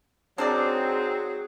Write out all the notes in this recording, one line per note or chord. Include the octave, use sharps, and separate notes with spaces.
G#2 F#3 C4 D4 G#4 A#4 D5